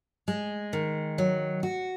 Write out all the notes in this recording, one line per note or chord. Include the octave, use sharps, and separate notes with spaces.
G#3
D#3
F#3
F#4